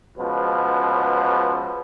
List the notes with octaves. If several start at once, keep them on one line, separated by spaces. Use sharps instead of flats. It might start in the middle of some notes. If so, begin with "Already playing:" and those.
C#2 B2 F3 B4